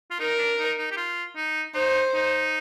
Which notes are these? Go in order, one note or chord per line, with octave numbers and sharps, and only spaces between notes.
F4
D#4 A#4
D4
D#4
D#4
G4
F4
D#4
D#4 C5
D#4